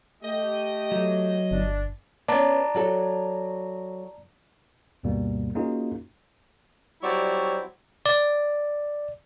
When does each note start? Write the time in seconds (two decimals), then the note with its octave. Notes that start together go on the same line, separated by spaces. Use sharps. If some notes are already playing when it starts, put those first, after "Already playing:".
0.23 A3 G4 D#5
0.92 F#3
1.51 G1 D4
2.28 B3 C#4 D5 A5 A#5
2.75 F#3 F#4 A4
5.03 D2 G2 B2 G3 A#3
5.55 A#3 C#4 D#4 F4 F#4 G#4
7.03 F#3 G3 C4 E4 C#5 D5
8.06 D5